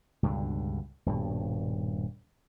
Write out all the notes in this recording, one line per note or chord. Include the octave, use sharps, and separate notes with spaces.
C#2 G2 B2 D3
D#1 G2 B2